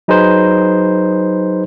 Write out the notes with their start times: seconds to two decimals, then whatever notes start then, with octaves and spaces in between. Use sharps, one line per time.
0.08 F#3 D#4 G#4 B4 C5